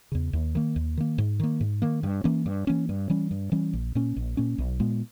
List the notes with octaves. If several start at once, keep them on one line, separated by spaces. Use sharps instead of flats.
E2 C#3
D#2
D#3 A#3
D#2
D#3 A#3
G#2
D#3 A#3
G#2
D#3 A#3
G2
E3 A#3 C#4
G2
E3 A#3 C#4
G2
E3 G3 C#4
G2
E3 G3 C#4
A#1
A#2 A#3 C#4
A#1
A#2 A#3 C#4
B1
A#2 G#3 B3